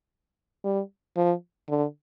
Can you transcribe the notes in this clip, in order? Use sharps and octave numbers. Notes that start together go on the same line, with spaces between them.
G3
F3
D3